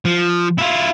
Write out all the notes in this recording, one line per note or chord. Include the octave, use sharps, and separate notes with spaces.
F3
E4 F4